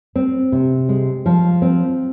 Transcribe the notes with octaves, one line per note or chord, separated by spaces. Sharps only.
C4
C3
G#3
F3
C4